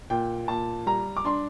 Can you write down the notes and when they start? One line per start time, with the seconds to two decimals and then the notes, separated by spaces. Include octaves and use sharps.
0.10 A#2 G5
0.48 A#2 A5
0.87 G3 A#5
1.17 D6
1.25 D4 C6